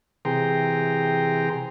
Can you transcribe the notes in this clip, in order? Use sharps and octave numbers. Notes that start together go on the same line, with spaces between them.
C3 E3 G#4 G5 A#5 C6